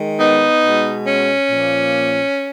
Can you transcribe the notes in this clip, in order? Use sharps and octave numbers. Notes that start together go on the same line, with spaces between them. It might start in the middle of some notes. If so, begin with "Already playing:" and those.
Already playing: D#3 G#3
B3 D#4
B2 G#3
C#4
A#2 F3 A#3